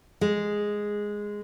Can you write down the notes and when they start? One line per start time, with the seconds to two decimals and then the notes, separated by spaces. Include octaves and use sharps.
0.21 G#3